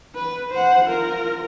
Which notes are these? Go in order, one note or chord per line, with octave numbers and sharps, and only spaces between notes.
B4
C5 F#5
F4 A#4